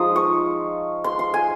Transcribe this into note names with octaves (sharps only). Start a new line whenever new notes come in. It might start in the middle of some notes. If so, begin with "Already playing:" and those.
Already playing: F3 G#3 D#4 D#6
C#6
C6
C6
G#5